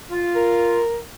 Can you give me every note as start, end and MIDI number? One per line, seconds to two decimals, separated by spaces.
0.11 0.80 65
0.35 0.97 70